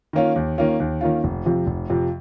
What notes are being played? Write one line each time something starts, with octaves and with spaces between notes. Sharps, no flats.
D#3 A#3 C#4 F4
D#2
D#3 A#3 C#4 F4
D#2
D#3 A#3 C#4 F4
F1
F2 C3 F3
F1
F2 C3 F3